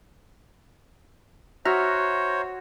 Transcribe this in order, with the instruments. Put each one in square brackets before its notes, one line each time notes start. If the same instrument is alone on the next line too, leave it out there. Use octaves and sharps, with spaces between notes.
[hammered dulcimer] F#4 [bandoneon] C5 C#5 [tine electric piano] E5 A#5 F6